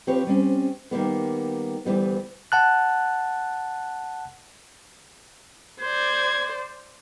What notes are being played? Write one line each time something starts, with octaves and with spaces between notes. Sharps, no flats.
F3 C4 G4 B4 C#5
G3 C4 C#4
D#3 G3 A#3 B3
D2 E3 G3 B3
F#5 A5 F#6
C5 D5 G#6